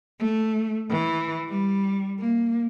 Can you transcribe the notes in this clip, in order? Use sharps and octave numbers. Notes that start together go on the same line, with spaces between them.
A3
E3
G3
A#3